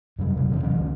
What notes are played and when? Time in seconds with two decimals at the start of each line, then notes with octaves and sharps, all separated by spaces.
0.19 F#2 C3 G3
0.33 F2 C3 F#3
0.50 C3 E3 G3 C#4
0.63 E3 F#3 C#4
0.78 C#2 D3